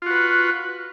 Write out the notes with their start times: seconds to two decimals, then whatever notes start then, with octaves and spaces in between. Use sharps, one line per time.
0.02 F4
0.06 F#4
0.11 B4